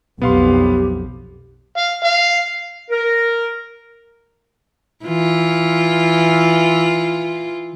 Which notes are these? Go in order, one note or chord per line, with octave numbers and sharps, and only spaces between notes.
B1 F2 B3 G4 F5 C6
F5
F5
A#4
E3 F4